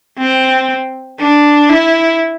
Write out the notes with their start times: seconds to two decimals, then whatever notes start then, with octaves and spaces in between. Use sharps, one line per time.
0.18 C4
1.19 D4
1.70 E4